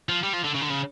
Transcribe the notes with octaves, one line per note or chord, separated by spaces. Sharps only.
F3
G3
F3
D3
C#3
D3
C#3